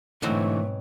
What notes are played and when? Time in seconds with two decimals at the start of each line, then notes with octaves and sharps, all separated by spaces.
0.22 G#2 B2 D3 E3 F#3 A3 C4